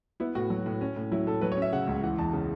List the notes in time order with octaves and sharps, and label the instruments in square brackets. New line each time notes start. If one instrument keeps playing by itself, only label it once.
[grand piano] B3 E4
A2 F#4
F#3
A2
C#4
A2
F#3 E4
A2 A4
F#3 B4
C#5
C#4 E5
C#3 F#5
C#2
E3 F#5
E2 A5
C#3